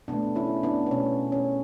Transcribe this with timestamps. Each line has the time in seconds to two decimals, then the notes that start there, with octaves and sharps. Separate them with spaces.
0.08 B2 A3 B3 D4
0.36 C#4 E4
0.63 B3 D4
0.87 B3
0.91 B2 A3 C#4
1.32 C#4